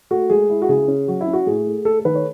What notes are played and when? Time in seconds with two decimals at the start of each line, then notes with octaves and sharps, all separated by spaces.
0.11 A3 F#4
0.30 G#3 G#4
0.50 E4
0.62 F#4
0.69 C#3 G#4
0.88 C#4
1.08 F#3 F#4
1.21 E4
1.27 C#4
1.33 F#4
1.46 A2 G#4
1.66 A3
1.85 A3 A4
2.00 A4
2.05 D#3 B4
2.15 C#5